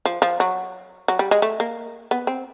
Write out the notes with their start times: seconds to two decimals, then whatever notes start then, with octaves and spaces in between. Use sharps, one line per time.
0.05 F3
0.22 F3
0.40 F#3
1.08 F#3
1.19 G3
1.31 G#3
1.42 A3
1.60 A#3
2.11 B3
2.27 C4